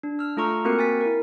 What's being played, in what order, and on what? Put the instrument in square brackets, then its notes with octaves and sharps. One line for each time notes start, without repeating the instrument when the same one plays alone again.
[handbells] D4
E6 F6
A3 F4 A4 A#5 C#6 F6
A#3 C4 F#4 A#4 F#6 C#7
G#5 A6 B6
E4 A#4